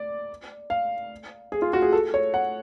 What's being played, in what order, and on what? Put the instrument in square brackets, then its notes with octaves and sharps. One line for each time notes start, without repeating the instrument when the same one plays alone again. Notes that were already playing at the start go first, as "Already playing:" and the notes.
Already playing: [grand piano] D5
F5
G#4
F4
F#4
G#4
A4
C#5
F#5